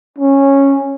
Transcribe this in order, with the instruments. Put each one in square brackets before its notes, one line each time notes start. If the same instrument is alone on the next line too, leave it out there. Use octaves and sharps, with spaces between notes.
[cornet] C#4